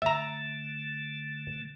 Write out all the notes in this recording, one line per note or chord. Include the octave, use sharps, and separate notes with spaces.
D3 A3 E5 A#5